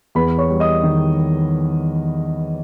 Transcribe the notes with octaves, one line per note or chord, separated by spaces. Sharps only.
E2 B4 B5
C#5 C#6
G3
D#5 D#6
D#3